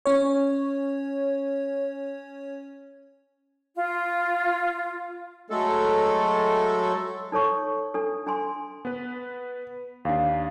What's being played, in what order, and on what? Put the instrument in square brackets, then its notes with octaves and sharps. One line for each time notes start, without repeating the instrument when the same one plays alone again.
[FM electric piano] C#4 C#5
[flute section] F4
[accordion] F#3 G#3 A3 A4
[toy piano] D#4 A4 C#5 C#6
D4 A4
D4 G#5 C6
[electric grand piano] B3 B4
[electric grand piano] D#2 D4 [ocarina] F5